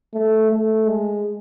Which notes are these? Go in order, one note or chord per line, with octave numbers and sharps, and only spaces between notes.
A3
A3
G#3